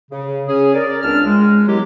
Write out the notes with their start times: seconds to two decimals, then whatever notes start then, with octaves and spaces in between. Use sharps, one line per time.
0.11 C#3
0.47 C#4 G#4
0.74 A#4 D5
1.03 C#2 C4 D4 A5 F6
1.26 G#3
1.67 D#3 F#3 G#3 B3 E4 G4